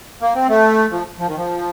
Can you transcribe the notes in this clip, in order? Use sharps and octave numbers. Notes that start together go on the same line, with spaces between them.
A#3
C4
A3
F3
F3
D#3
F3